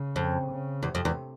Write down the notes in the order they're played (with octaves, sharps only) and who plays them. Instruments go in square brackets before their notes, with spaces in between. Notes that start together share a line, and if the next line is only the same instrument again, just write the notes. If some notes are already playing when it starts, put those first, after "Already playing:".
Already playing: [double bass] C#3
[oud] F2
[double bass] C#3
[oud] E2 [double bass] C3
[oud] F2
E2